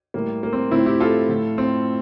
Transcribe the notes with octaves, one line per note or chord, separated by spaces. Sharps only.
A2 G3 A#3
A#3
C4
A2 F3 C4 E4
E4 G4
F4 A4
A2 F3
C4